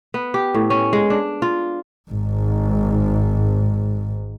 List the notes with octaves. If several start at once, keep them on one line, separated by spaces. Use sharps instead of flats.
B3
G4
A2
C#4
G#3
D4
F4
G#1 G#2